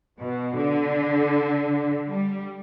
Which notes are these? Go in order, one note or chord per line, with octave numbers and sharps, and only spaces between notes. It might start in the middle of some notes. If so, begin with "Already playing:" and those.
B2
D3
G3